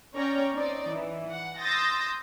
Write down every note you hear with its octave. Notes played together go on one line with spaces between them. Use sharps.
C#4 C#5 D5 G5 A#5
C4 D#4 D5
E3
F#5
C6 D#6 E6 G6 A6 A#6